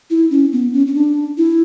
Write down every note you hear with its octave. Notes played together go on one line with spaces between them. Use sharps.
E4
C#4
B3
C#4
C#4
D4
E4